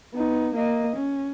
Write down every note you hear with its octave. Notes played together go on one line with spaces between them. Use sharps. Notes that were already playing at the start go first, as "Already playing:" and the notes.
B3 D#4
A#3 D#5
C#4